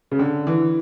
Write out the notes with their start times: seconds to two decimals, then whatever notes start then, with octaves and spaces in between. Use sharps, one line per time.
0.11 C#3
0.19 D3
0.47 E3